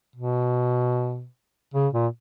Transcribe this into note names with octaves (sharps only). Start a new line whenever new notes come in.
B2
C#3
A#2